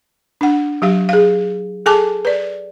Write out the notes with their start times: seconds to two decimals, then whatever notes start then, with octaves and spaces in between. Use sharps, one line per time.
0.41 D4 F#5
0.82 F#3 G4 F5
1.09 G#4 F5
1.86 G#4 A4 G#5 A5 D6
2.25 B4 D5